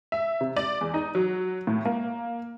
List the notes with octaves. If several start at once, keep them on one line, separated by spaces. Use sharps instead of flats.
E5
C3
D5
E2
D#4
F#3
A2
A#3